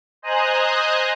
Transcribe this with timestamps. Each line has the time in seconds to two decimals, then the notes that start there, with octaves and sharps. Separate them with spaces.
0.22 C5 D#5 G#5 A#5 D#6 F#6